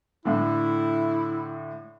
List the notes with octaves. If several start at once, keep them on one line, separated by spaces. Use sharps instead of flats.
A2 D3 E4